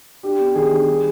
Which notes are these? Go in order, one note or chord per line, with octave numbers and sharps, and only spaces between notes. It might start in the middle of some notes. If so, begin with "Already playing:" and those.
D4 G4
B3
D#3 G#4
D4
G3